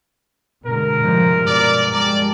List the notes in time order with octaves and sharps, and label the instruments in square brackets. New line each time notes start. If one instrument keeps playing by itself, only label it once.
[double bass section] B2 D3 G#3 [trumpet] A#4
[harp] G2 F3 G#3 [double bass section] C3
[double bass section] B2 [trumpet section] D5
[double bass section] G3 G#3 [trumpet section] D5 [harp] A5